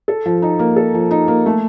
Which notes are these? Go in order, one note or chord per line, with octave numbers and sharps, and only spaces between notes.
A4
F3
D#4
A#3
A4
F3
D#4
A#3
A3